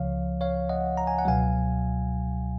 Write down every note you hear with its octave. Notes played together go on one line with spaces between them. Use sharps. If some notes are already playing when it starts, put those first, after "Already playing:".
Already playing: C#2 C#3 F3 C#5 F5
C#5 F5
D#5 F#5
A#5
G#5
F#5
C#2 B2 F#3 F5 G#5